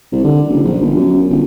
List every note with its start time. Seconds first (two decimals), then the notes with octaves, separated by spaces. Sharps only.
0.12 C2
0.24 D3
0.49 F#1
0.64 A#1
0.82 G1
0.96 F#2
1.30 G1